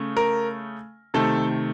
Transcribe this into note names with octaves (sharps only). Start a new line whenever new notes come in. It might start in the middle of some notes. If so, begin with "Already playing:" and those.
Already playing: C#3 A3
A#4
C3 D#3 A3 A4